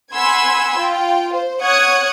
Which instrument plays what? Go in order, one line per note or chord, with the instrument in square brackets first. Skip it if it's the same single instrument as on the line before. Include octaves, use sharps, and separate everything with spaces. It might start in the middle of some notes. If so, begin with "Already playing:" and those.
[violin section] F#5 G#5 B5 C6 E6 G#6
F4 G5
C5
C#5 F#5 C#6 D#6 F#6 G#6